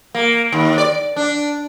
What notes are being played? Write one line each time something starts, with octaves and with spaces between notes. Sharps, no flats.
A#3
D#2
D5
D4